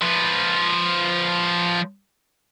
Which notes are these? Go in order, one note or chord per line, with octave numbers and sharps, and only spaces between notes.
F3 B4